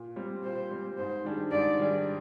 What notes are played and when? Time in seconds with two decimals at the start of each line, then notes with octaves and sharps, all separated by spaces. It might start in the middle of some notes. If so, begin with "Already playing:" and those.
Already playing: A#2
0.16 G3 C4
0.44 A#2 C5
0.71 G3 C4
0.98 G#2 C5
1.25 D#3 G3 D4 G#4
1.52 G#2 D5
1.79 D#3 G3 D4 G#4